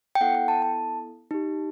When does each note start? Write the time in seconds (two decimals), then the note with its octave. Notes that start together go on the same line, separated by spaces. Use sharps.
0.15 G5
0.21 B3 E4 A4 F#5
0.35 G5
0.48 A5
0.62 A5
1.31 D#4 G4